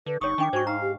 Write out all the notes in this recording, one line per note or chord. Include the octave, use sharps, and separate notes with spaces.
D3 B4
G1 D#4 C#5 C#6 D#6
D#3 D4 G5 D6
G#2 F#4 C5 G#5 C#6
D#4 F5 A#5
G4